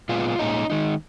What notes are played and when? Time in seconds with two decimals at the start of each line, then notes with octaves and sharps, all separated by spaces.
0.09 A#2 G#3 B3 F4
0.39 A#2 G#3 C#4 D#4
0.70 D#3 G#3 D#4